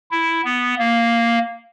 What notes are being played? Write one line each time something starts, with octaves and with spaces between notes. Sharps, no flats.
E4
B3
A#3